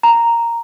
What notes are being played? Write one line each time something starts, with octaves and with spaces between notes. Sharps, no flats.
A#5